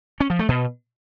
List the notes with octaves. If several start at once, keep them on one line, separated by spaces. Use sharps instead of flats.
C#4
F3
A3
B2